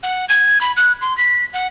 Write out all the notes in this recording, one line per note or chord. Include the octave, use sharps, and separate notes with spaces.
F#5
G#6
B5
F#6
C6
B6
F#5